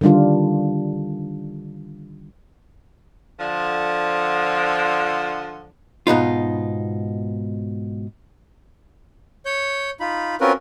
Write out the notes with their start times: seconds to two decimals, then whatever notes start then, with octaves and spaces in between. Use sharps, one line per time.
0.01 D3 D#3 G3 D4 F4
3.39 D3 F3
6.07 G#2 B2 D#4 F4
9.46 C#5 G6
10.00 D#4 F4 B5
10.41 C4 C#4 F4 F#4 A#4 B4